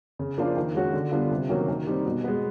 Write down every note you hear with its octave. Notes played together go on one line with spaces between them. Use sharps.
C#3
F3 A#3 D4 F4
D#3
G#3 C#4 F#4
D3
G3 B3 D4 F4
C3
D#3 F#3 A#3 C#4
D#3
G3 C4 D#4
B2
G#3 B3